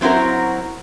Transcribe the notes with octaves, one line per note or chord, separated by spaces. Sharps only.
F#3 C4 E4 F#4 A#4